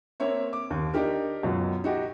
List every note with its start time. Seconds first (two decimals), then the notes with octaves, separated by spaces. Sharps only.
0.20 A#3 C4 C#5 E5
0.53 D6
0.70 D#2
0.93 D4 D#4 G4 A#4
1.43 C#2 F#2 B2
1.84 D#4 F#4 G4